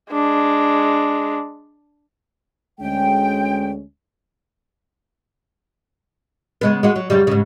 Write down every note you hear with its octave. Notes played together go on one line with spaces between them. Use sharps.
G#3 D4
D2 G#3 C#4 G5
C#3 G#3 B3
G#3 F#4
F#3
F#2 C#3 G3
G#2 C#3